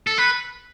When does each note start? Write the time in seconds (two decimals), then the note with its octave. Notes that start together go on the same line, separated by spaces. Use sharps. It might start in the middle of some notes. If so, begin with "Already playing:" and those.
0.07 A4
0.18 B4